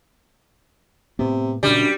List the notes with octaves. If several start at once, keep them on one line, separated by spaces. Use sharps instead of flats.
A2 C3 B3
F#2 A#2 C#3 G3 D4